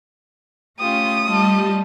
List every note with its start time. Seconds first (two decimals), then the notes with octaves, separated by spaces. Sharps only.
0.79 A3 C#4 F4 G4 D#6
1.26 G3 F4 D#5 A5